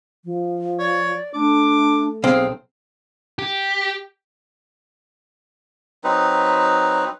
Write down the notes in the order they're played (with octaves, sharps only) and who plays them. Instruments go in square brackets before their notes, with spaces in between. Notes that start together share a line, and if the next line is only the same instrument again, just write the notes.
[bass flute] F3
[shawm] C#5 [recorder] D5
[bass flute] A3 [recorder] D4 [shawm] D6
[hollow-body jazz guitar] B1 C4 [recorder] G#4 [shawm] F5
[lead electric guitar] G4
[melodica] F#3 C4 D#4 B4